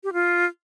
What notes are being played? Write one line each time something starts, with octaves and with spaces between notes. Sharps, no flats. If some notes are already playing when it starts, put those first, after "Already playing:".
G4
F4